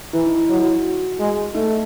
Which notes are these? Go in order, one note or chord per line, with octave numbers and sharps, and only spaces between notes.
E3 E4
D#4
E4
F#3
F#4
G#3
A3 D#4